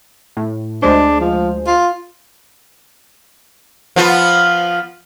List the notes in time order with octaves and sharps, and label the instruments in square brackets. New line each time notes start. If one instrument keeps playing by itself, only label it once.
[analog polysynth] A2
[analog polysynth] D2 G#3 C5 [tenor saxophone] D4
[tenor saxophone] F3
F4
[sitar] F3 B3 F4